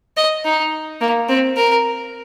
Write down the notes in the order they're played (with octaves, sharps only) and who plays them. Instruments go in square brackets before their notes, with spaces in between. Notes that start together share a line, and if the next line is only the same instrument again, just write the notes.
[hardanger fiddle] D#5
D#4
A#3
C4
A#4